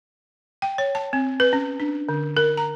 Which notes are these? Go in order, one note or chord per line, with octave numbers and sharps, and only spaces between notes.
G5
C#5
A5
C4
B4
C#4
D4
D3
A#4
A#5